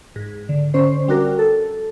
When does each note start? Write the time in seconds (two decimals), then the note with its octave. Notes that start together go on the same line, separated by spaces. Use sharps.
0.16 G#2
0.49 D3
0.74 D3 C#4 C5
1.08 G3 D4 F#4 A#4
1.39 A4